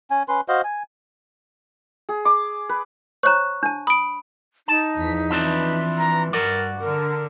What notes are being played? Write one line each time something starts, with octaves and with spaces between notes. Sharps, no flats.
C#4 G#5
C#4 B4 C6
F#4 C5 D#5 F5
G#5
G#4
D6
B4
C5 C#5 A#5 C#6 F#6
D4 A5
B5 D#6 D7
D#4 A5
E2 F3 B6
E3 F3 C4 D4
A#5
G2 F#4 A#4 D5
D3 A#4